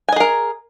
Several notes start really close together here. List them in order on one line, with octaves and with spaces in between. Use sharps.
G#5 D#5 G#4 A#4